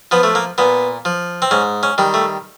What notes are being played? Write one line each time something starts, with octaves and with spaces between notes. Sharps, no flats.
F3 B3
A3
A#3
A#2 B3
F3
C4
G#2 C#4
C#4
D#3 G3
A3